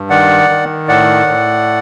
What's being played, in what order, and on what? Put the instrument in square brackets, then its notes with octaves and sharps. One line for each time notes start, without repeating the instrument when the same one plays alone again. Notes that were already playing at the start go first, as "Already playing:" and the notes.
Already playing: [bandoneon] G2
D#3 D5 F#5
D#3
A2 D5 F#5
A2